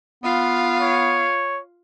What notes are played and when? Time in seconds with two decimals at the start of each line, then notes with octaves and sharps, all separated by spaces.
0.24 B3 F4 F5
0.80 C#5